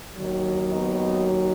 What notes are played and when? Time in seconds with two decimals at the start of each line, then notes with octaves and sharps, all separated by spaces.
0.17 D#2 D#3 F#3
0.71 B3 D#4